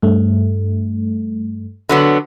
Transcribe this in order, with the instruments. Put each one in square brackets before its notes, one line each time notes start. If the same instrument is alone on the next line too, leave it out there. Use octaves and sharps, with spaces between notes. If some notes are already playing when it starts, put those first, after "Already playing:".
[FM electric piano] G2 A3
[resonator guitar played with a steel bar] D3 F#3 B3